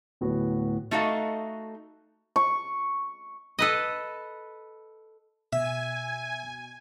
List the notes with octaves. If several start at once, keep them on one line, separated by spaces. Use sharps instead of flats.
D1 A2 B3 F#4
A3 D#4 F#4 A4 D#5 F5
C#6
A4 B4 D#5
B2 E5 G#5